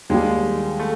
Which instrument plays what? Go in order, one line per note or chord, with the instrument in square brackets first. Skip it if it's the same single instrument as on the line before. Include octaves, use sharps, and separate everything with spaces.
[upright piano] D#2 D#3 G3 [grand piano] G#3
[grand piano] A3